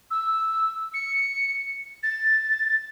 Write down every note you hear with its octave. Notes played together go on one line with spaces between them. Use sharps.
E6
C#7
A6